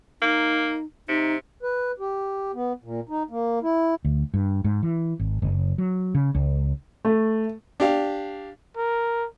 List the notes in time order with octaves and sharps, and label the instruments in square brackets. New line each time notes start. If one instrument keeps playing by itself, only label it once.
[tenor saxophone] A#3 [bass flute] D#4
[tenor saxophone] C3 [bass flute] D#4
[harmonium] B4
G4
B3
A#2
D#4
A#3
E4
[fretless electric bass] D2
G2
G#2
E3
G#1
F#1
F#3
C#3
C#2
[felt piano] A3
[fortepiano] D4 G4 F5
[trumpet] A#4